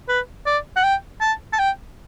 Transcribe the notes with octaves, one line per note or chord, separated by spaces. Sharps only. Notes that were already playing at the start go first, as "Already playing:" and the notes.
B4
D5
F#5
G5
A5
A5
G5